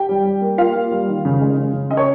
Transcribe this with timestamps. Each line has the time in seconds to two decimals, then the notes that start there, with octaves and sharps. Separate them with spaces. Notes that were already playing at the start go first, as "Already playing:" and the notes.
Already playing: G4 G5
0.09 G3
0.25 G3
0.41 A#3
0.58 A#3 F4 F5
0.75 A#3
0.91 G3
1.08 D#3
1.25 C#3
1.41 G#3
1.57 C#3
1.73 C#3
1.91 C#4 D#5
1.97 C#5